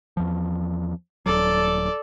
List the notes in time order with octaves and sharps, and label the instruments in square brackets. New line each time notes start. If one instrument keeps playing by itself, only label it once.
[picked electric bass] E2 F3
[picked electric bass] D#1 F#3 [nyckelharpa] A4 D5